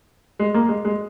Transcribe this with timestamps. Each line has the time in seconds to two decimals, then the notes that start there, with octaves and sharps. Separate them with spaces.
0.39 G#3
0.54 A#3
0.69 G#3
0.85 G#3